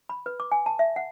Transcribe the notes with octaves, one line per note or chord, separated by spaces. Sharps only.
B5
B4
D6
G#5
A5
E5
F#5